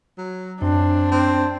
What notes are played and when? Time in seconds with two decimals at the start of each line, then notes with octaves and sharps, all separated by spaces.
0.18 F#3
0.62 F#2 C4 D4
1.11 C4